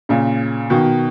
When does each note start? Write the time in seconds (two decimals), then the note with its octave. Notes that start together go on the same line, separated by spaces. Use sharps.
0.09 A#2 C#3
0.70 B2 D#3